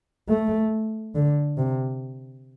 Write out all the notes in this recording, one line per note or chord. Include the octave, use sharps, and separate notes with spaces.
A3
D3
C3